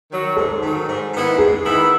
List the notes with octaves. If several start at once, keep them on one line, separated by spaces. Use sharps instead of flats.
D#3 F#3
G#2 A4
D#3 F#3
G#2
D#3 G#3 B3 E4
G#2 G#4
D#3 G#3 B3 E4